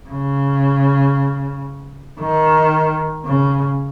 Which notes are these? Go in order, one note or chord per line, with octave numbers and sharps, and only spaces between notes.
C#3
D#3
C#3